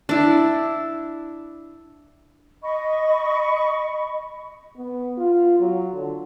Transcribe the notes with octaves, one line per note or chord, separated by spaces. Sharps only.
D4 E4
D#5 B5 C#6
B3
F4
F#3
D3